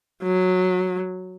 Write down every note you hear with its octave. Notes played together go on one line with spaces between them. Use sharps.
F#3